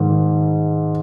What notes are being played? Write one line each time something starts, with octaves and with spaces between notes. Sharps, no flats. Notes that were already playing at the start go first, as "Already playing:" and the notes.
Already playing: G#2 D#3